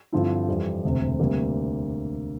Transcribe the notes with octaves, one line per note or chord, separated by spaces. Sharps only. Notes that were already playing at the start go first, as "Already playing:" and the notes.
G2 D3 F3 C4 E4
F2 E3 G3
E1 D2 C3
D2 C3 G3 A#3